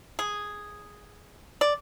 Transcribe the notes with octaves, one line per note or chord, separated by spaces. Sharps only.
G#4
D5